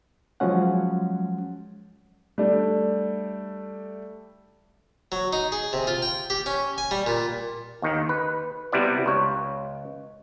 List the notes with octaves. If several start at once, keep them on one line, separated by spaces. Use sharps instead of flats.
F3 F#3 G#3 C#4 F#5
G3 A3 D4
F#3
D#4
G#4
C3
F4
G5
G4
C#4
G#5
G3
A#2
D#2 D#3
B4
C3 G3 B3 E4 D5
C#2 C#5